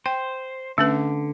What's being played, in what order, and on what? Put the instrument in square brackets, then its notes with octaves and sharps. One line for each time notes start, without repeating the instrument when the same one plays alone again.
[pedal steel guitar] C5 [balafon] G5
[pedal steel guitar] D3 [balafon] A3 C#4 B4